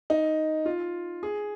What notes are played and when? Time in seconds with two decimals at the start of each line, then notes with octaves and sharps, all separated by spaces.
0.10 D#4
0.66 F4
1.23 G#4